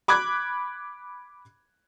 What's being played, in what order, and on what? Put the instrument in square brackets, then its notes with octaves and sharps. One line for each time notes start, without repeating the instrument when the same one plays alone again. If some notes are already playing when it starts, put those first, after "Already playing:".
[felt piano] B5 D6 F#6 G#6